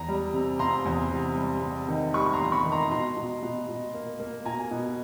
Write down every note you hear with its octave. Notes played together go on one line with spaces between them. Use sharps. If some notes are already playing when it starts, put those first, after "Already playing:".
Already playing: E2 A#5
G3
C3
C3 A#5 C6
E2
C3
G3
C3
D#3
G3 B5 C#6
C#6
A#5 C6
E2
B5 C#6
D#3
A#5 C6
B2 A#5 C6
B2
B2
B2
A#3
A#3
B2 G#5 A#5
B2